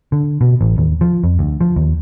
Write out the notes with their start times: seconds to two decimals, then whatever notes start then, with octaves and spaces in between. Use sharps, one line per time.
0.12 D3
0.41 B2
0.61 A1
0.78 D#2
1.01 F3
1.24 F2
1.39 D2
1.61 F3
1.76 D#2